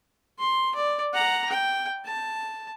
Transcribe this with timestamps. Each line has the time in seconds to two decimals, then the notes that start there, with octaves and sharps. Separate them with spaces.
0.39 C6
0.75 D5
1.14 F#5 A#5
1.50 G5
2.05 A5